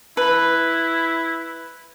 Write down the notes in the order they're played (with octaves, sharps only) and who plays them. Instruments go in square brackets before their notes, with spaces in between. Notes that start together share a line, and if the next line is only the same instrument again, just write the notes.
[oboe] E4 [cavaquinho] B4